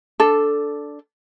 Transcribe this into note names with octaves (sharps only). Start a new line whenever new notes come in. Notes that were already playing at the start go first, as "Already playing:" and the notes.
D4 A4